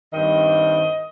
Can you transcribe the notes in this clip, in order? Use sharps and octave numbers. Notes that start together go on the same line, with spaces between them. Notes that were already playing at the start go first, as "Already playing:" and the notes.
G2 D#3 G3 C4 D#5